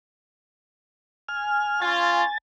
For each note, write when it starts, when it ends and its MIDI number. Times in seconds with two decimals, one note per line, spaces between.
1.28 1.81 80
1.28 1.81 89
1.82 2.23 61
1.82 2.23 65
1.82 2.38 80
1.82 2.38 93